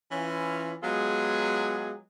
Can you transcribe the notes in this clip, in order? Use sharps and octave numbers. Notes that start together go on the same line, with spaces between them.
E3 C#4 F4
F#3 G#3 B3 F4 G4 G#4